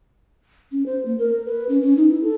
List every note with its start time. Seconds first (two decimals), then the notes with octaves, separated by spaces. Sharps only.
0.72 C#4
0.86 C5
1.05 A#3
1.19 A#4
1.46 B4
1.69 C#4
1.82 C#4
1.97 D#4
2.09 E4
2.23 A4